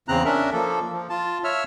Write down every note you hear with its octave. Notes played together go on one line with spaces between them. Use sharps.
E2 C#3 C4 A#5 F#6
C#4 D4 A#4 E5
F3 A#3 A4
F3
F4 A5
C#5 E5 E6 F6